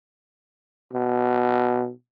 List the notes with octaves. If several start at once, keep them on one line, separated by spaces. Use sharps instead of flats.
B2